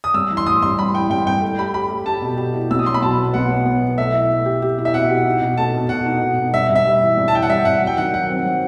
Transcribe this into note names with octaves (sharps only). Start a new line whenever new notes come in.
D#6
G2 E6
E3
C6
A1 D#6
G2 C6
G3 B5
E3 G5
G2 G5
G2 G5
A3
G4 B5
G4 B5
A3
G4 A5
B2
G4
E4
B1 E6
D#6
F#3 C6
B5
B2 A5
B3
B1 F#5
F#3
B3
B2
A3 E5
E4
A3
G4
G4
E4
E5
B2 F#5
G4
D#4
B2
A3 A5
B2
B2 F#5
D#4
B2
B2
G2 E5
G2
E5
G3
E3
G2
A5
E3 G5
F#5
G3 E5
G2 F#5
F#3
G5
D#3 F#5
F#3 F#5
C4
F#3